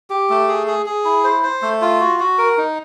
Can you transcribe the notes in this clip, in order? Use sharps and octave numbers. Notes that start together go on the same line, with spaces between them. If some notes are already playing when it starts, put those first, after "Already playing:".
G4
A3
G#4
G#4
G#4
E4
C5
C5
A3
F4
F#4
F#4
A#4
D#4